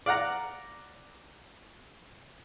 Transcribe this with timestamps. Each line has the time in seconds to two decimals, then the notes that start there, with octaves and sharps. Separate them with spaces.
0.06 D5 F5 F#5 A#5